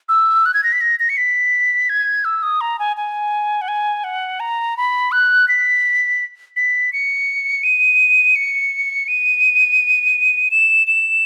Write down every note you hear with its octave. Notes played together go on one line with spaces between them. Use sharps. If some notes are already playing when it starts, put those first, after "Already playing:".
E6
F#6
G#6
A#6
B6
A#6
A#6
C#7
B6
G#6
E6
D#6
A#5
G#5
G#5
F#5
G#5
F#5
A#5
B5
F#6
B6
B6
C#7
D#7
C#7
D#7
E7
E7